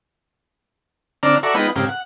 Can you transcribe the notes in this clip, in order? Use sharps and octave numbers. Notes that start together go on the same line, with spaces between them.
D3 C4 D4 D5 A#5 F6
F#4 A4 D5 E5 A#5 C#6
G#3 B3 D#4 F4 B4 G5
G#2 C#3 C4 G4 A#4 F5
F#5